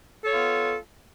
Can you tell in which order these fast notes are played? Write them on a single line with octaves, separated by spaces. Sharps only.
A4 C#5 F4 B3